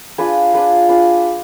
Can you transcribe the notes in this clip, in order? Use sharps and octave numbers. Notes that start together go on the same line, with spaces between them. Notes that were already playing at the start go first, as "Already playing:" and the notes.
D4 F4 G#4 B4
D4 F4 G#4 B4
D4 F4 G#4 B4